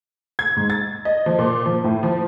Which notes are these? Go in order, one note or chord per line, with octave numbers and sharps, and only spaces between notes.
G#6
G#2
A6
D#5
F3
A#2
F3
A2
F3